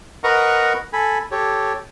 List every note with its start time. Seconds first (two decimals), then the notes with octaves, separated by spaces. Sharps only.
0.24 A#4 B4 D#5 F#5 A#5 C#6
0.93 A4 G#5 B5
1.32 G4 A4 C#5